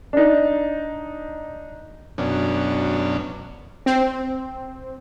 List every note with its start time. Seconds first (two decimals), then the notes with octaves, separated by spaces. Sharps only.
0.13 D4 D#4
2.18 F#2 B2 C#4 D4
3.86 C4